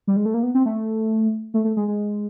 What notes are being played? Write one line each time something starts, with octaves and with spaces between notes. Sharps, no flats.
G3
G#3
A3
A#3
B3
C4
A3
A3
A3
G#3
G#3